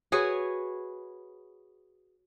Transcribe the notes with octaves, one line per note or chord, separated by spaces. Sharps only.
F#4 G#4 B4 C#5